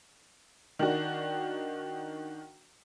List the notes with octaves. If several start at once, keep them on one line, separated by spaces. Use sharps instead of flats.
D#3 D4 F#4